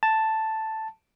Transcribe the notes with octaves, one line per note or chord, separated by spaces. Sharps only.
A5